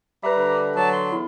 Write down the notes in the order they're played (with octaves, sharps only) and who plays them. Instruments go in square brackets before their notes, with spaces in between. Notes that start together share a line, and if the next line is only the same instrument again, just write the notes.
[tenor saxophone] G3 [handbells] B4 E5 [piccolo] A#5
[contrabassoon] D3
[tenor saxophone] F#3 [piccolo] A5
[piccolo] C6
[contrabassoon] E2 [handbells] E4